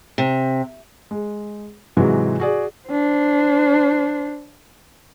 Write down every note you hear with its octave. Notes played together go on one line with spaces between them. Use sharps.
C3
G#3
G#2 C3 E3 F#3 G#3 F#4
F#4 G#4 D5
D4 C5